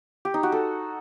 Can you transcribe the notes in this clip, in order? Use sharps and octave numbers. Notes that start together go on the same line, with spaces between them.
G4
D#4
F#4
A4